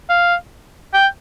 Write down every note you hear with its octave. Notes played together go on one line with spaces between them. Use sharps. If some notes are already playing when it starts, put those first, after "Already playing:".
F5
G5